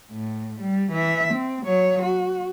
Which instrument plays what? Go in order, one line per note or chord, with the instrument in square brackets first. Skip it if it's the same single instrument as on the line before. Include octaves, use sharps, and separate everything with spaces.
[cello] A2
G3
E3 E5
C4
F#3 C#5
F#4